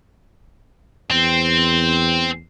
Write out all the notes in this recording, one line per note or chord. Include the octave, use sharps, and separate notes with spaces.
E2 C4